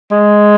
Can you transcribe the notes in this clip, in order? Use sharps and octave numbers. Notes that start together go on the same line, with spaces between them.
G#3